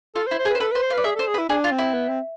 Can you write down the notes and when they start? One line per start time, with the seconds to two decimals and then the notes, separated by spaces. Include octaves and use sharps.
0.15 F4 A4
0.27 C5
0.31 E4
0.38 C5
0.45 G#4
0.50 B4
0.55 C5
0.60 A4 B4
0.72 B4 C5
0.83 C5
0.90 F5
0.94 B4 D5
1.04 G#4 E5
1.15 A4 C5
1.27 G#4
1.34 B4
1.38 E4
1.49 D4 G#4
1.64 F4
1.71 C4
1.78 E4
1.94 B3
2.09 C4